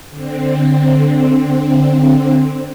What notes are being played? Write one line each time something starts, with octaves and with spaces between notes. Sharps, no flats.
D3 C4